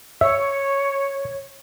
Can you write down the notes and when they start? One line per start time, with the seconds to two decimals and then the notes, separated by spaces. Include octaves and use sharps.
0.21 C#5 E5